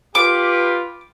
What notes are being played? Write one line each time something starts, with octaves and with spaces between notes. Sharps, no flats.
F4 G4 B4 D6